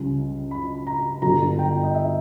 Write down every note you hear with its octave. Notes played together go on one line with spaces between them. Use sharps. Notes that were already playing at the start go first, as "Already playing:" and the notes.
Already playing: C#2 C#3 G3
B5
A#5
G1 G2 G3 A#5
G5
D#5
E5